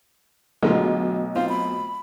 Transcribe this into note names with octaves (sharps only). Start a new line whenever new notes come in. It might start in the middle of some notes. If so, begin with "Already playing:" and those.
B1 D3 G#3 A3 B3 F4 F#4
C4 F4 F5
B5